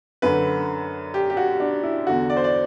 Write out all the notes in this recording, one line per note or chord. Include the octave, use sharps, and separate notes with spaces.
F#2 D3 B4
G4
G4
F#4
D4
E4
E2 D3 F#4
D5
C5
D5